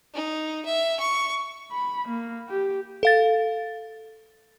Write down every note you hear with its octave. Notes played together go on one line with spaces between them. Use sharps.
D#4
E5
C#6
B5
A#3
G4
A4 F5 A6